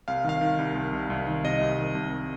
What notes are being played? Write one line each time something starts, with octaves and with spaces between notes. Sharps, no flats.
C2 F5
D#3 F5
D#3
C2
C2
C2
C2
D#3
C3 D#5
C2
D#3
C2